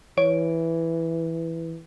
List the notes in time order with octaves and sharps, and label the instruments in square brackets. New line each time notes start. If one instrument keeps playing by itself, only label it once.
[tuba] E3 [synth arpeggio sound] C#5 D7